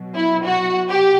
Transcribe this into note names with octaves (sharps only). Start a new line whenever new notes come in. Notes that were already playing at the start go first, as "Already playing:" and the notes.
Already playing: B2 F#3
E4
F#4
G4